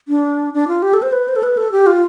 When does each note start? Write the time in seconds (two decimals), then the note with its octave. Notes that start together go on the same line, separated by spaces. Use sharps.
0.08 D4
0.54 D4
0.68 F4
0.82 G4
0.94 A4
1.02 C5
1.13 B4
1.28 C5
1.36 A4
1.43 B4
1.57 A4
1.72 G4
1.87 F4